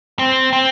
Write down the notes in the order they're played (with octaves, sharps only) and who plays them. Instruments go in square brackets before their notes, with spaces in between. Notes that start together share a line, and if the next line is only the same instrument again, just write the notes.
[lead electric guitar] C4
C4